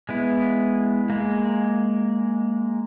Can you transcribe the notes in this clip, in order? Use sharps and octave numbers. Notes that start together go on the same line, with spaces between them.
G#3 B3 E4
G#3 A#3